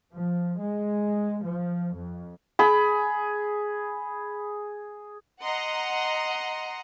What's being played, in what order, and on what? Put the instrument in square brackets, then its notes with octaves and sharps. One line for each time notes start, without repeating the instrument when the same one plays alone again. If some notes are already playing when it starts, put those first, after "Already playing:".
[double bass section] F3
G#3
F3
F2
[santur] G#4 B5
[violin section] D#5 F#5 A#5 C6